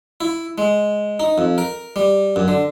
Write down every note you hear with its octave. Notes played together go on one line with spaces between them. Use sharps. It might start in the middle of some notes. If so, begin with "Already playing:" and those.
E4
G#3
D#4
F2
A#4
G3
F#2
D3